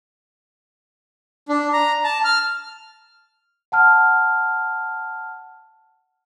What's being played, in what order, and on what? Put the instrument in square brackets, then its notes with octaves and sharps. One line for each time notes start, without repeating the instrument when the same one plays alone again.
[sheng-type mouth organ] D4
A#5
A5
F6
[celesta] F#5 A5 F6